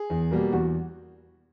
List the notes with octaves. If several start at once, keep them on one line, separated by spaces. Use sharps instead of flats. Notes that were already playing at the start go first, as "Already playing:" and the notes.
Already playing: G#4
E2
B2 G3 A#3
E2 F#4